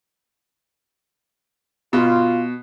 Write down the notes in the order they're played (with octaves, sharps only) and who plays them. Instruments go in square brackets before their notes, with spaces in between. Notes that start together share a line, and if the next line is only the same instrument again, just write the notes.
[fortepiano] B2 [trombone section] F4